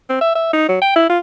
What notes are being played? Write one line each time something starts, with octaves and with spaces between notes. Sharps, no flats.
C4
E5
E5
D#4
F#3
G5
E4
F4